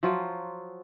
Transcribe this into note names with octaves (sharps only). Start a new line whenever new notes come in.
F3 F#3 F4